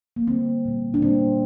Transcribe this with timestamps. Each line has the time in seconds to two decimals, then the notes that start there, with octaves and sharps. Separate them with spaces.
0.16 A#3
0.27 D3 G3 A#3 C4
0.65 A#2 G3 A#3
0.94 D4
1.02 A#2 G3 A#3 C4